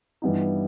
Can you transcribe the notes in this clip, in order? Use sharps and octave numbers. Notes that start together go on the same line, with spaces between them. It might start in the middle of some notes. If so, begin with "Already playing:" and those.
G2 E3 G3 B3 D#4